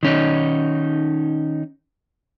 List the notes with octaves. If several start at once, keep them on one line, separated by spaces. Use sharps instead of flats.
D#3 C#4 D#4